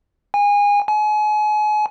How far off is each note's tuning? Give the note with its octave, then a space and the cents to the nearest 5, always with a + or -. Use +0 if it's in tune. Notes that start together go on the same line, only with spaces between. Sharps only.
G#5 -25
G#5 +35